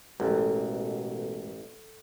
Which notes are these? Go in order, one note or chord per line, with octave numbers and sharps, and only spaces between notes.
A1 B2 G#3 F#4 A4 A#4